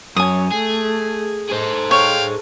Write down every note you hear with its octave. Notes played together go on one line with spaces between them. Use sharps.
F#2 C#5 G#5 D#6
A3 G#4
G#4 A4 C5
C#5 F5 G5